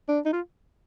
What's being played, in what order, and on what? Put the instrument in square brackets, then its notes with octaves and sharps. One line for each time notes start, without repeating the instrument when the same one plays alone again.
[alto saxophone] D4
D#4
F4